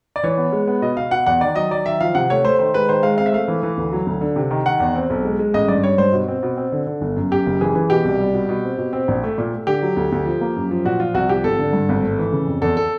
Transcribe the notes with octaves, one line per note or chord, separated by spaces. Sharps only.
D5
E3 C#5
B3
G#3
B3
B2 D#5
B2 F5
B2 F#5
E2 F#5
D#3 D5
F#3 D#5
F#3 D5
D#3 E5
F3 F5
C3 F#5
A3 C#5
A3 C5
D#3 C5
G#3 B4
D#3 C5
G#3 F5
C4 F5
E5
A3 F5
E3
E3
D2
F#3
D2
D3
C3
D#3
D#3 F#5
E2
C4
B1
G#3
G#3
A1 D#5
G2 D5
G3 C#5
G2 C5
B2
C4
B2
C4
D3
D3
G1
F#2
F#2 G4
F#1
E3 G#4
E3
B2 G4
C2
G3
B2
B2
C4
B2
C4
A#1
A3
A#2
A3
D3 G4
F#3
D2
D2
F3
A#3
F#2
F3
A#2 F#4
F3 F4
C2 F#4
F3 G4
G#1 A4
D3
G2
G#1
A3
E3
C#3
F2
E2 A4
A4